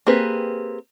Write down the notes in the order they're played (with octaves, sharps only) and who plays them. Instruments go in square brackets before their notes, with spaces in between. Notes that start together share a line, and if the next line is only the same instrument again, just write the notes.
[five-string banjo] A#3 C4 G4 G#4 B4